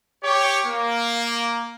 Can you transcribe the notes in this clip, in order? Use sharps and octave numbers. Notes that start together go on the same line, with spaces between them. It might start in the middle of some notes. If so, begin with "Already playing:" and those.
G4 C#5
A#3